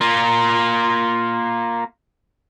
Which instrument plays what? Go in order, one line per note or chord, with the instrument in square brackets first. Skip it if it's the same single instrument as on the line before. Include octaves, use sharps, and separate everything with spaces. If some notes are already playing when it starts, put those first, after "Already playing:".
[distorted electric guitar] A#3 F4